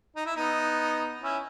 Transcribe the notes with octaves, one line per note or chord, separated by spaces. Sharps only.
D#4
E4
B3 D#4
C#4 E4